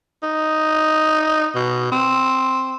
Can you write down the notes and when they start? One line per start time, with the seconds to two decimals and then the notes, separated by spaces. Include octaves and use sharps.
0.23 D#4
1.55 B2
1.92 C4